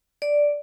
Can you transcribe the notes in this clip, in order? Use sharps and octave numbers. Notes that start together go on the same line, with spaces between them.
D5